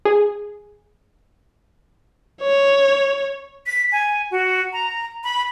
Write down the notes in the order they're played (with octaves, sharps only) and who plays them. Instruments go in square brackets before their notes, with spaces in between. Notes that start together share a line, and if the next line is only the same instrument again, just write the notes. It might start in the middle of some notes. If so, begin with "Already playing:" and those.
[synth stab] G#4
[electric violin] C#5
[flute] B6
G#5
F#4
A#5
B5